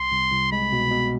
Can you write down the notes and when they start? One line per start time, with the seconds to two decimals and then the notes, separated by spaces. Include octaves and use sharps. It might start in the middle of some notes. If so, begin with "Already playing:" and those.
Already playing: C2 C6
0.12 C2
0.32 C2
0.52 G#3 B5
0.72 B2
0.91 B2